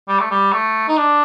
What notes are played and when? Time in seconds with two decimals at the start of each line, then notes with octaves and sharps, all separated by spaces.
0.08 G3
0.20 A3
0.31 G3
0.52 A3
0.88 D#4
0.97 D4